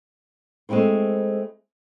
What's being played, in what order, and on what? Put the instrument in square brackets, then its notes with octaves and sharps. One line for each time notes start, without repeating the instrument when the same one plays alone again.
[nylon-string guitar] G#3 A3 C4 E4 C5